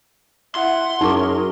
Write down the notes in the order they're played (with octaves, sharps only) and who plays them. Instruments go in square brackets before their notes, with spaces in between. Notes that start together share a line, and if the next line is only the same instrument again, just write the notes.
[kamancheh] E4 F#5 [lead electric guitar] C6
[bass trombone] F#2 [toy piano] D#4 C#6 D6 [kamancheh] G#4 A#4